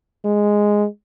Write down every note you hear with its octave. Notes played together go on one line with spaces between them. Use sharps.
G#3